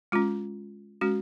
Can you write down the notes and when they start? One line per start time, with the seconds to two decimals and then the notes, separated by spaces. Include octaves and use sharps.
0.12 G#3 C#4 F4
1.01 G#3 C#4 F#4